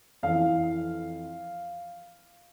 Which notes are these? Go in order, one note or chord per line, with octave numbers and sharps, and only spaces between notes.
F2 E3 F5